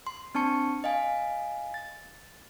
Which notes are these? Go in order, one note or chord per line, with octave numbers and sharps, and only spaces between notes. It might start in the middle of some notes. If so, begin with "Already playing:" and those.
C6
C4 D4 A5 C#6 C#7
D#5 F5 G#5
A6